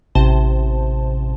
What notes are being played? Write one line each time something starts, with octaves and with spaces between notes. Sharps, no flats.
A1 C3 C5 A5